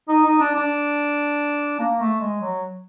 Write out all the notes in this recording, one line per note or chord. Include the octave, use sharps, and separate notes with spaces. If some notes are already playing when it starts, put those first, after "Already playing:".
D#4
D#4
D4
D4
A#3
A3
G#3
F#3